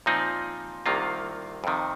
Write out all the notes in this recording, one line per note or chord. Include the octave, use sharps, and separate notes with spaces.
A#2 F3 C4 D#4
C2 C3 D#3 A#3 F4
F2 C3 D#3